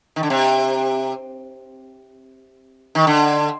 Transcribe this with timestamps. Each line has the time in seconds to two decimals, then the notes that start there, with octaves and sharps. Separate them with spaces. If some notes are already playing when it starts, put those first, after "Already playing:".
0.16 D#3
0.23 D3
0.30 C3
2.95 D#3
3.07 D3